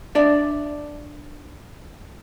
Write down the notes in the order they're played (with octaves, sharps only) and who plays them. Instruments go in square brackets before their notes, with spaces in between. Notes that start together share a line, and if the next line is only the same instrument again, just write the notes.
[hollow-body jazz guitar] D4 D5 E5